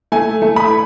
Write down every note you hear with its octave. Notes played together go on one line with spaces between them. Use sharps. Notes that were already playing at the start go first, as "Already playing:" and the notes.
A3 G#5
A3
B5